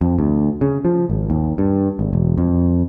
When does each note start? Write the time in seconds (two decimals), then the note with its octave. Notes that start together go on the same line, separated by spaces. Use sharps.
0.01 F2
0.19 D2
0.61 C#3
0.85 F3
1.10 G#1
1.30 D#2
1.58 G2
1.99 G#1
2.13 E1
2.38 F2